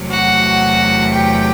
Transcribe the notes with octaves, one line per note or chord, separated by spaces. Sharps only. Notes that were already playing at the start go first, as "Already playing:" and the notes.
Already playing: E2 C3 F#3 A3
F#4 F#5
G4 G5